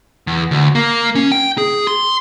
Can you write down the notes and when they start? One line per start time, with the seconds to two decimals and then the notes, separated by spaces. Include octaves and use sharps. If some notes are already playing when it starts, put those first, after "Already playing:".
0.27 E2
0.51 D2
0.75 A#3
1.15 C#4
1.32 G5
1.58 G#4
1.87 C6